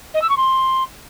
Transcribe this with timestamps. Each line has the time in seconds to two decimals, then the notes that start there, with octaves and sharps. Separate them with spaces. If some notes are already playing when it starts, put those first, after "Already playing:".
0.14 D#5
0.22 E6
0.29 C#6
0.37 C6